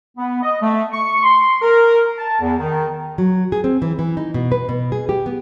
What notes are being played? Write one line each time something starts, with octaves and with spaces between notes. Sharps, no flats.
B3
D#5
A3
C#6
C6
A#4
A5
E2
D#3
F#3
G#4
C4
E3
E3
D#4
B2
B4
B2
G#4
G4
B3